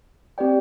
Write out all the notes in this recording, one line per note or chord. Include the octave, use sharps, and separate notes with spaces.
C4 G4 D5 G5